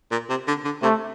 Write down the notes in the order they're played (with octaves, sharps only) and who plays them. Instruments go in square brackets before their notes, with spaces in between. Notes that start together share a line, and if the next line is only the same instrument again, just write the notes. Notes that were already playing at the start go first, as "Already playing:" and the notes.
[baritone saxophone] A#2
C3
D3
D3
[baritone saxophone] C3 [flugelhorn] A3